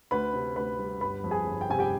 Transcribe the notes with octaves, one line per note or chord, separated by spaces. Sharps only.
D2 B4 B5
C3
D2 B4 B5
G3
G1 B4 B5
F2
G#4 G#5
G1
G5
C3 G#5
G4 G5